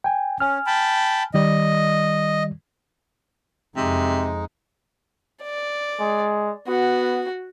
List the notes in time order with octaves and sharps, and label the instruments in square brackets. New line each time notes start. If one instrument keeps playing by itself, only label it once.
[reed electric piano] G5 G#5
[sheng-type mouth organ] C#4 [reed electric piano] G#5 F6
[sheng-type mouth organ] G5 A5 B5
[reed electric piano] D#3 G3 D5 [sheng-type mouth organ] D#5
[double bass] F2 [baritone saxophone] C3 [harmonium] G#3 D#4
[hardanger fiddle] D5
[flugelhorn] G#3
[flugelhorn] B3 [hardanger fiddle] F#4